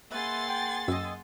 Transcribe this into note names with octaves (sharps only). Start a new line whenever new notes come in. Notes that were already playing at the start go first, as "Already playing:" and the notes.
A#3 G#4 B4 E5 F#5 C6 A6
G5
F#2 D#5 E6